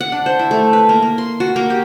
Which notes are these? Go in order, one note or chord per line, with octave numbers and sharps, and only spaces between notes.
F#5
D4
C5
E4
A3
B4
A#3
A#3
C6
F#4
A#3
G4